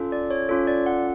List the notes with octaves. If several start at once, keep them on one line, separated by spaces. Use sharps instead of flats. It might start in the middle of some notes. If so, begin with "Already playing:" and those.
Already playing: C#4 F4 A4
D5
C#5
C#4 F4 A4 C#5
D5
F#5